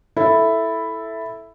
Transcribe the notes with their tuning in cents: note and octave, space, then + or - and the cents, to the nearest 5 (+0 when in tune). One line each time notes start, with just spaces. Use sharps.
E4 +0 A4 +0